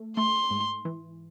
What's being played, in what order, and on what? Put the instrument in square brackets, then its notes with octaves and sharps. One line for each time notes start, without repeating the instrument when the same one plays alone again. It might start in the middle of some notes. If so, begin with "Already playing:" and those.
Already playing: [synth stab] A3
[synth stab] A3 [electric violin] C6
[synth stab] G#2
E3